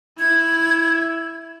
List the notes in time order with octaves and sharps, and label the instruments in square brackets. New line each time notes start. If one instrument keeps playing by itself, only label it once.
[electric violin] E4 [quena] G#6